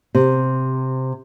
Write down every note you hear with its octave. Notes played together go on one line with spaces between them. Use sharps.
C3